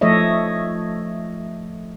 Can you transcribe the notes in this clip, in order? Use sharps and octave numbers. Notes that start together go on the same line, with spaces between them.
F3 A3 A4 C#5 D#5 E5